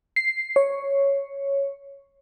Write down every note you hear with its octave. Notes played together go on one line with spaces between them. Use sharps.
C7
C#5